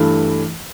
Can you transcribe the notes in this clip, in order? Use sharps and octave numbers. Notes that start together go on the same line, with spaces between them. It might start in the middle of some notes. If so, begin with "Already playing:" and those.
Already playing: G2 E3 A3